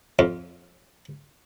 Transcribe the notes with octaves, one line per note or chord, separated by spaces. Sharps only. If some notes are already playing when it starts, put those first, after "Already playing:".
F2